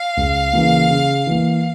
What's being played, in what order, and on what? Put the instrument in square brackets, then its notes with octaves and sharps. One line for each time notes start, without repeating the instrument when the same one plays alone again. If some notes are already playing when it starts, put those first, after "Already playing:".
Already playing: [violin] F5
[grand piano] C#2
C#3 E3 A#3
C#3
E3 A#3